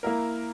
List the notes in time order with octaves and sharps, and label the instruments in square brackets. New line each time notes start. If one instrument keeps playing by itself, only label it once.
[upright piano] A#3 E4 A#4